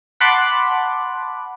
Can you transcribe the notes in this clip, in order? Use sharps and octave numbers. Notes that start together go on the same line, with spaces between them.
F#5 A5 B5 C6 D6 F#6